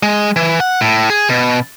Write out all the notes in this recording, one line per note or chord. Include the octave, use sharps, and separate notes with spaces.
G#3
E3
F#5
A2
G#4
B2